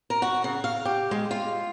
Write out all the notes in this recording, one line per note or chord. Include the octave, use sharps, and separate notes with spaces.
A#4
F#4
C#3
F5
G4
G#3
F4